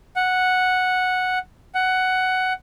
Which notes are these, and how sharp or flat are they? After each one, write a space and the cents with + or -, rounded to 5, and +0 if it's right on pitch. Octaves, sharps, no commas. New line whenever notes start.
F#5 -5
F#5 +10